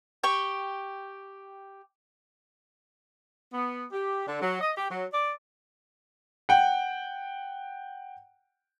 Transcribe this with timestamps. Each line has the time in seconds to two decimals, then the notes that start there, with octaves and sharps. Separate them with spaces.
0.23 G4 G5 C#6
3.52 B3
3.92 G4
4.26 D3
4.41 F#3
4.60 D#5
4.76 G4
4.89 F#3
5.12 D5
6.49 F#5 G5